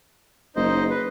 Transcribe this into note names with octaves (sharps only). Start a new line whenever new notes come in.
F#1 D#4 C5 D#5
B4